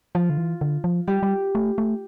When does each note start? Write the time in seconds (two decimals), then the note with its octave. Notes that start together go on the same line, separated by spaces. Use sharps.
0.15 F3 F4
0.30 D3
0.38 E3
0.61 D3
0.84 F3
1.07 G3 G4
1.23 G3
1.55 A3
1.78 A3